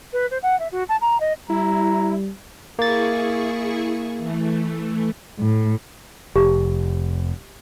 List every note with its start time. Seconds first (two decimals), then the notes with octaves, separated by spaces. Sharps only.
0.13 B4
0.31 C5
0.42 F#5
0.59 E5
0.71 F#4
0.89 A5
1.01 A#5
1.20 D#5
1.50 G3 E4 A#5
2.79 A#3 E4 G#4 C#6 A6
4.18 E3 A3
5.39 A2
6.36 F1 G4